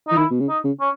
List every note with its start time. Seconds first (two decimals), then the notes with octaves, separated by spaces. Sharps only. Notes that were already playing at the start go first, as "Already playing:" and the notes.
0.08 E3 D#4
0.17 D#3 E4
0.31 B2
0.40 C#3
0.49 D#4
0.64 C#3
0.80 C#4